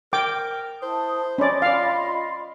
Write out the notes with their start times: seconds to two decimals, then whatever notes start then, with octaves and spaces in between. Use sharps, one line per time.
0.13 A#4 G5 D6
0.82 E4 C5 A5 D#6
1.38 C#4 D5 D#5 B5 C6
1.62 F4 D5 F5